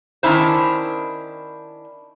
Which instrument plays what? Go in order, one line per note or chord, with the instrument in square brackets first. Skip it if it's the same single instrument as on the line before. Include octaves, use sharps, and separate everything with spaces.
[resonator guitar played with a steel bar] D#3 F3 C#4 D4 E4 C5